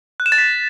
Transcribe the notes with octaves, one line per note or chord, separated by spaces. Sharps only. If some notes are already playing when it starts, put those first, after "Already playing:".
F#6
E7
A6
B6